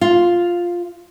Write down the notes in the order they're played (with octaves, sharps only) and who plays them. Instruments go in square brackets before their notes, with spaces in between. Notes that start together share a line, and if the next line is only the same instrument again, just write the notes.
[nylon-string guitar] F4